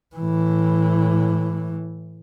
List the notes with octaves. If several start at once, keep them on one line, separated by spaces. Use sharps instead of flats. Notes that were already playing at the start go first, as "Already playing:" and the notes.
A2 E3